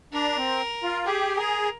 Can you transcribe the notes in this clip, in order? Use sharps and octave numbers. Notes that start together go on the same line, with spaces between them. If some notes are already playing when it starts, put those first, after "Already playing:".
D4 A#4
C4
F4
G4 G#4
G#4 A#4